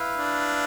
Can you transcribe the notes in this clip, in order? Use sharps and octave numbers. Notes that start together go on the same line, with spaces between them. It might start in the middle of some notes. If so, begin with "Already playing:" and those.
Already playing: E4 B4 F5
D4